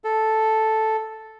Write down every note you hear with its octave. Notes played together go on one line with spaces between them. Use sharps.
A4